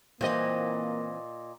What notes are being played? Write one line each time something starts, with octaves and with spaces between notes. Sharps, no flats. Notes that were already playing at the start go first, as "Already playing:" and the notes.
A#2 E3 A#3 C4 D#5